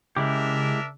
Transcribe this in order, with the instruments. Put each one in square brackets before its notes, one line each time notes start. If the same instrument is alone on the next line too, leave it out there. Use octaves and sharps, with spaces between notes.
[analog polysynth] C#3 [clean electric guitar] G#3 E4 G4 [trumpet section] D4 A#4 E5